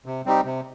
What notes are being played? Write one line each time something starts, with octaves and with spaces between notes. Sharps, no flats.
C3
G3 C4 D#4 G4
C3